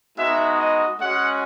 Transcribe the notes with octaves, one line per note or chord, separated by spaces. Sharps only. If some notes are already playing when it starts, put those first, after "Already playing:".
G#3 B3 D#4 F#4 E5
D#5
G#3 C#4 F#4 F#5